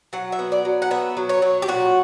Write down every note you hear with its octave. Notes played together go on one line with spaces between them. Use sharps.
F#3 F#5
E5
B3
D5
F#3
F#5
B3 E5
F#3
C#5
F#3
G4
A#2 F#4